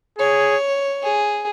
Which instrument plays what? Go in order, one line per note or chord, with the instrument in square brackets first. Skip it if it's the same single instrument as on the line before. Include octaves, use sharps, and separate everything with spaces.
[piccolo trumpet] G#4 [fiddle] C#5
[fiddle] G#4